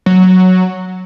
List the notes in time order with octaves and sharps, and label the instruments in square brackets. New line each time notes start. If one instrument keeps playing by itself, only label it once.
[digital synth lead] F#3